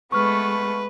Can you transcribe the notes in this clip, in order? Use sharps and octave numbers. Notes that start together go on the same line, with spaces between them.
G#3 A3 B3 B4 C#6 F6